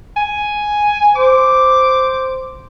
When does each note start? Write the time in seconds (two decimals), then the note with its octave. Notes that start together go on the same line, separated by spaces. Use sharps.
0.17 G#5
1.16 C5 D6